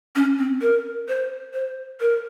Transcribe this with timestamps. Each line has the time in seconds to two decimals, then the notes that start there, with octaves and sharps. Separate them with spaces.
0.16 C#4
0.39 C4
0.62 A#4
1.08 C5
1.54 C5
2.01 A#4